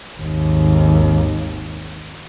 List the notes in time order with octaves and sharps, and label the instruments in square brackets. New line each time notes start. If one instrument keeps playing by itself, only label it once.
[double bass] G#1 D#2